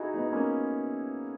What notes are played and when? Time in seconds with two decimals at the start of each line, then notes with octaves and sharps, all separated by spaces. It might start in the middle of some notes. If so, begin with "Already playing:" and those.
Already playing: D#4 E4 F#4 G#4
0.14 B3 D#4
0.26 B3
0.33 A#3 C#4